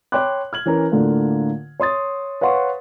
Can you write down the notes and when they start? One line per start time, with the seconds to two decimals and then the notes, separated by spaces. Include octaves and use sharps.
0.12 C#5 G5 B5 C6 D6 F#6
0.53 F6 G#6 F#7
0.66 E3 C#4 A#4
0.92 A2 D3 A3 A#3 F4
1.80 C#5 C6 D#6 A6
2.41 B4 C#5 F5 F#5 C6 C#6